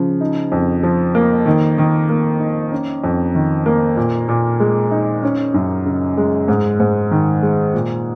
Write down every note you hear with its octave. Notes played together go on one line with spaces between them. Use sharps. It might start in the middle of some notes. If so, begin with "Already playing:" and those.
Already playing: C#3 F3
D#4
F2
F3
A#3
D#3
D#3
A#3
D#4
C#4
F2
D#3
A#3
A#2
A#2
G#3
D#4
C#4
F#2
C#3
G#3
G#2
G#2
D#3
G#3
A#2